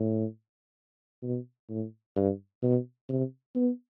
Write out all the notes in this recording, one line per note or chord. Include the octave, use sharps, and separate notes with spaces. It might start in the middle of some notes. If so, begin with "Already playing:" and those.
Already playing: A2
B2
A2
G2
B2
C3
B3